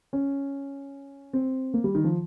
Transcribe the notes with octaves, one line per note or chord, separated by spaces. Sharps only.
C#4
C4
A#3
G3
D#3
F3